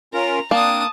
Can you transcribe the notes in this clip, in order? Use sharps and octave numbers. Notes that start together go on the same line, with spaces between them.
C#4 F4 A#4 A#5
A#3 C4 D4 A5 D#6